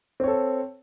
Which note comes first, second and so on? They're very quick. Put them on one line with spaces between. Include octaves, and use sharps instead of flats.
C4 C#5 A4